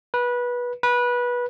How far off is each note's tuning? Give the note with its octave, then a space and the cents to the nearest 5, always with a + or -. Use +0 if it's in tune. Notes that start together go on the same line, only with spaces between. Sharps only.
B4 -20
B4 -20